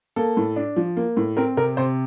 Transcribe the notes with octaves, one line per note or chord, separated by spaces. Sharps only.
A#3 A4
A2
D4
F3
A#3
A2
C4 A#4
C3 A#4
C3 C5